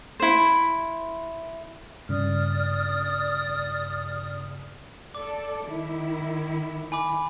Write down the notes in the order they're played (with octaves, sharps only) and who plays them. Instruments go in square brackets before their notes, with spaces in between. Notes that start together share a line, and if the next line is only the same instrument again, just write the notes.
[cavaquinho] E4 C5
[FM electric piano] G2 C#3 [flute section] D5 D#6 F6
[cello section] A4 D5 [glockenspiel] D6
[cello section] D#3 E4
[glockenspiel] G#5 B5 D6